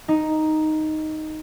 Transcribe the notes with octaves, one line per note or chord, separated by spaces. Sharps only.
D#4